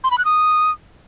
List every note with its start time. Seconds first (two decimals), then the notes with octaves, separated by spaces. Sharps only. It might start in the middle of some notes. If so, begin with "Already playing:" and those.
0.04 C6
0.11 B5
0.18 F#6
0.25 D#6